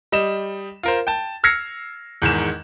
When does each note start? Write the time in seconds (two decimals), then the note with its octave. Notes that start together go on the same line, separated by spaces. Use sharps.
0.12 G3 D#5 E7
0.83 F4 A#4 C5
1.07 G5 A5
1.44 E6 F6 G#6 A#6 C7 C#7
2.22 E2 G#2 D#3 E7